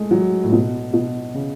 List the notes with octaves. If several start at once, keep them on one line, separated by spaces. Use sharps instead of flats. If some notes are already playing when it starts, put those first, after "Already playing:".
Already playing: G#3 A3
F#3
A2
B2
B2
C#3